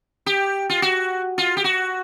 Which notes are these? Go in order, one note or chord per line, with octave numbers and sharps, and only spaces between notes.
G4
F4
F#4
F4
G4
F#4